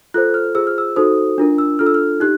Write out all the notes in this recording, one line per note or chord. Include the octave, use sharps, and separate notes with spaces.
F4 A4 C5 F#6
F6
F4 G#4 C5 E6
F6
E6
D#4 F#4 A4 C5 D#6
D4 F4 A#4
E6
D4 F4 A4 F6
E6
F6
D#4 G4 F#6